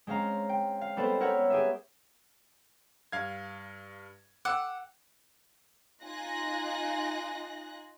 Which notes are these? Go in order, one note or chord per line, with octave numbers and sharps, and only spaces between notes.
G#3 C4 C#4 F5 A#5
G5
F5
G3 B3 C4 A4 B4 C5
A#4 B4 C#5 F#5 E6 G6
G4 G#4 E5
G2 F5 G#6
F#5 D6 E6
D#4 F4 G#5 F#6 A#6